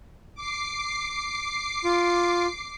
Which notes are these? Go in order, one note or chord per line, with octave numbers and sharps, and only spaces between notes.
D6 C7
F4